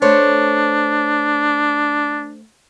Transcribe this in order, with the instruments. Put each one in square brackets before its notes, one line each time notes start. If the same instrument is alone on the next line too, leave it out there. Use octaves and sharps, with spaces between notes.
[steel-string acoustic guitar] A3 C5 C#5 [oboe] D4